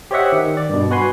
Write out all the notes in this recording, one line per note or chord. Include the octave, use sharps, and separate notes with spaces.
G4 C5 C#5 D#5 E5 F#5
D#3
D5
G2 B2
F#4 B4 G#5 C6